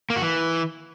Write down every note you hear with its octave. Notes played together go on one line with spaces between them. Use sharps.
A#3
F#4
E3